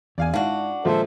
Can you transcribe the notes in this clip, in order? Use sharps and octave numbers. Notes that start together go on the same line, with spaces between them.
E2 D5 F5 G#5
G#2 D4 E4 F#4 F5
A#1 F3 G#3 A4 C5 E5